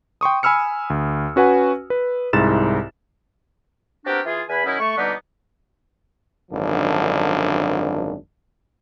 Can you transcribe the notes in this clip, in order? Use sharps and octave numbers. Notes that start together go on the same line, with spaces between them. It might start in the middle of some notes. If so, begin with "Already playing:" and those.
G5 C6 C#6 D#6
G#5 B5 E6 F6 C#7
D2
C#4 F#4 B4 F#5 G#5
B4
C2 G#2 E4 A6 E7
B3 C4 D4 F#4 G4 A#4
E3 F4 G#4
E2 G#5 B5
D#3 F#3 C#4 D#4 E4
A3 C#6
B2 D3 G3 A#3 B3 D#4
G#1 F#2 D3 F3 D4